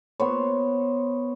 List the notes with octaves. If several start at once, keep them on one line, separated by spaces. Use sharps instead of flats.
B3 C5 C#5